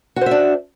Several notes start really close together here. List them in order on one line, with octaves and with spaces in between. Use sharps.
F#4 C5 E5 D4